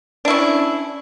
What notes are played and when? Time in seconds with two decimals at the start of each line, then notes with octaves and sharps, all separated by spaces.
0.25 D4
0.28 E4
0.30 C#4